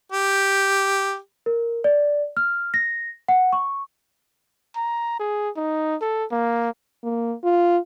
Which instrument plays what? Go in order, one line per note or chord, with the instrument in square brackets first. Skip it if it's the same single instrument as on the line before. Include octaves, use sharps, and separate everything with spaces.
[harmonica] G4
[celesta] A#4
D5
F6
A#6
F#5
C#6
[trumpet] A#5
G#4
D#4
A4
A#3
[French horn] A#3
F4